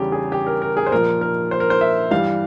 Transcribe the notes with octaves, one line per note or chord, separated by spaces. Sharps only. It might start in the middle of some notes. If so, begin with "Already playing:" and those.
Already playing: E2 C#3 G3 G4
G#4
G4
A#4
A#4
G#4
C5
A#2 F3 A#4
A#4
C5
A#4
C5
E5
G2 E3 G3 F5